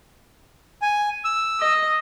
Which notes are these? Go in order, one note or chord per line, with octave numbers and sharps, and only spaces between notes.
G#5
E6
D#5